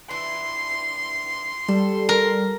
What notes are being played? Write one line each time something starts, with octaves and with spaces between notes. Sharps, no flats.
E3 D4 E4 C6
G3 A4
A#4